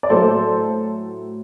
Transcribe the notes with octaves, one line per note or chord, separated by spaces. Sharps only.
D5
A2 F#3 A4 C5